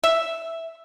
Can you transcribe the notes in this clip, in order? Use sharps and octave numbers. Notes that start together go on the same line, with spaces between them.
E5